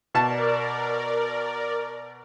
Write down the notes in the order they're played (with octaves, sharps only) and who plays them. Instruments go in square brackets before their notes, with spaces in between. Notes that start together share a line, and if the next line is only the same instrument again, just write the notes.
[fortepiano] B2 A5 [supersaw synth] A#4 D5